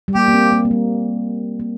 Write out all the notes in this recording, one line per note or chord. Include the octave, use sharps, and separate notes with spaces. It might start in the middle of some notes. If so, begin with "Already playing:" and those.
G3
A#3 G4
A#3
C4
A#3
A#3
G3
A#3